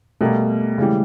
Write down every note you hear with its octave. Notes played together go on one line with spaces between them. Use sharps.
B2 G3 A3 A#3
C#3 E3 G3 G#3